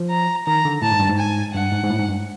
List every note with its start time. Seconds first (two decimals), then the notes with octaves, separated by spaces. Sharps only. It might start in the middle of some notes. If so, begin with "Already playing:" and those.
Already playing: F3
0.10 A#5
0.46 D#3 A#5
0.65 D3
0.82 A2 A5
0.92 G#2
1.00 G2
1.09 G#2
1.18 G#5
1.54 G2 F#5
1.72 G#2
1.84 G#2
1.89 A2
1.98 G#2
2.08 G2